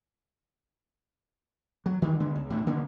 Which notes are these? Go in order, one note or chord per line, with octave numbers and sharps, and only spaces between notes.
F#3
D#3 E3 G3
D3 G#3 B3
C#2
D2 A2 E3
D3 A#3 B3 C#4